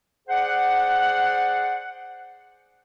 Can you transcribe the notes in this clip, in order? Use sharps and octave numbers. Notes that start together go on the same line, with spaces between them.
G#4 C5 D5 F#5